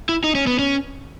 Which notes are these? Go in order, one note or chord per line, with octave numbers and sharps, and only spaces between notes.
E4
D#4
C#4
B3
C#4